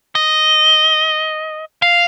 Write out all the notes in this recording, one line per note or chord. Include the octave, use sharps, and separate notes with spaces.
D#5
F5